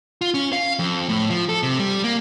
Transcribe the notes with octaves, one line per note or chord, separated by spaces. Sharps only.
F4
C#4
F5
F2
A2
F3
A4
C3
G3
A#3